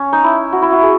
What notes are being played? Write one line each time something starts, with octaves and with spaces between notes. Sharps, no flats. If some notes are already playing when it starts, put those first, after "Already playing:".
Already playing: C#4
D#4
E4
F#4
E4
F#4
G#4